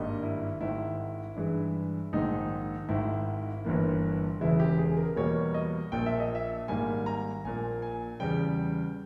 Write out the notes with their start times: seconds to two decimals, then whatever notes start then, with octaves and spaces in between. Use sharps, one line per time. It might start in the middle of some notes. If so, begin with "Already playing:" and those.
Already playing: G#1 G2 G3 A#3 D#5
0.23 E4
0.61 G#1 G#2 D#3 E4
1.36 G2 E3 G#3
2.13 A#1 G#2 D#3 D#4
2.89 G#1 G#2 D#3 E4
3.65 G1 G2 E3 A#3
4.40 E1 E2 C#3 E3 G#3 E4
4.60 G4
4.79 G#4
4.97 A#4
5.16 E2 B2 G3 A#3 C#5
5.54 D#5
5.92 A#1 A#2 A#3 G5
6.06 E5
6.20 D#5
6.35 E5
6.68 G#1 G#2 G3 A#3 G#5
7.06 A#5
7.44 A#1 A#2 A#3 G#5
7.82 G#5
8.20 E2 C#3 G3 G5